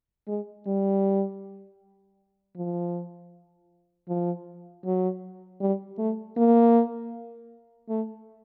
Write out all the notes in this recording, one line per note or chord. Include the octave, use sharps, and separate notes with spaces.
G#3
G3
F3
F3
F#3
G3
A3
A#3
A3